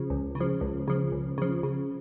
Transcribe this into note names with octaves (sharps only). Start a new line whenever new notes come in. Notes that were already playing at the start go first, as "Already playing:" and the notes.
Already playing: C#3 F3
C#2
C#3
F3
C#2
C#3 F3
C#2
C#3 F3
C#3